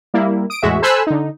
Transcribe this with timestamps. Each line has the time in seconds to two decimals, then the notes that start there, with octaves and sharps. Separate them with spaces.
0.14 G3 A#3 E4
0.50 D#6 D7
0.63 E2 A2 G#3 F#4 E5
0.82 A4 C5 G#5 B5 E6 F#6
1.07 D3 D#4